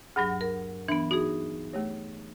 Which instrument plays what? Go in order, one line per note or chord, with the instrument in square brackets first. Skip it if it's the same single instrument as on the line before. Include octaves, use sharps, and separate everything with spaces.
[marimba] D2 G2 F#3 [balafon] G#4 F#5
[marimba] A#4
[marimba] E3 B3 [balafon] D4
[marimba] D#4 G#4 [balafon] F#4
[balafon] A3 G4 C#5